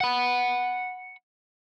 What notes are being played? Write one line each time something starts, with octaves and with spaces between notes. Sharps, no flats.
F#5 B5